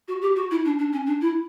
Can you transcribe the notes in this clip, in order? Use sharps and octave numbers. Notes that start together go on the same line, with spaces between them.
F#4
G4
F#4
E4
D4
D4
C#4
D4
E4